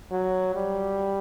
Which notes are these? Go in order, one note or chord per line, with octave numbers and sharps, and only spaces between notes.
F#3
G3